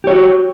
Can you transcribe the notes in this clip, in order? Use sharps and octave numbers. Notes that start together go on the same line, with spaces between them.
F#4 G4 C#5